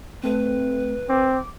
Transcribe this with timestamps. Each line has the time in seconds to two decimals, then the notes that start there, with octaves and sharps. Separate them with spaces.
0.23 A3 C4 B4
1.09 C4 D6